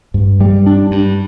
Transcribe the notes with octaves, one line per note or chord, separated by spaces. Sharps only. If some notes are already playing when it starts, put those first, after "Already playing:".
G2
G3
D4
G2